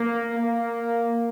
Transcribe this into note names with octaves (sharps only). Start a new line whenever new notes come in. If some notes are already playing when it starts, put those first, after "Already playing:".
Already playing: A#3
A#3